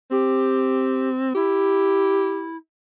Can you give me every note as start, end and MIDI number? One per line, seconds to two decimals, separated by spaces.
0.11 1.31 60
0.11 1.09 67
1.35 2.56 64
1.35 2.48 67